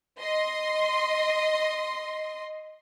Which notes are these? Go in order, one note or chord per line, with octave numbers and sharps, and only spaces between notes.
D#5 C6